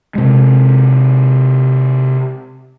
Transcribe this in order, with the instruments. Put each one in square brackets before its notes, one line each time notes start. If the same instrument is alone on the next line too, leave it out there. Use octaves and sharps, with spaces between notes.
[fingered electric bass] C3 G#3